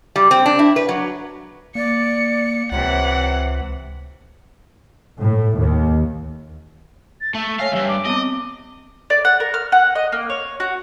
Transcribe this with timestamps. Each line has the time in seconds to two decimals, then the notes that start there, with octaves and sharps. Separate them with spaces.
0.16 G3
0.31 C4
0.46 D4
0.59 E4
0.76 B4
0.89 F#3
1.75 A#3 D5 C#7
2.72 C#2 C3 E3 C#5 F#5
5.18 A2
5.57 D#2
7.21 A6
7.34 A3 E5
7.60 C#5 F5 G#5
7.72 D2 G2 E5
7.89 D6
8.06 B3 C4 D#5
9.10 D5
9.25 F#5
9.40 A#4
9.54 F6
9.72 F#5
9.95 D#5
10.12 A#3
10.30 C#5
10.60 F#4